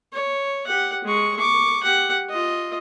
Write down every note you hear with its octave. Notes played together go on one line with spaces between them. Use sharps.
C#5
G4 F#5
G#3 C#6
C#6 D6
G4 F#5
F4 D#5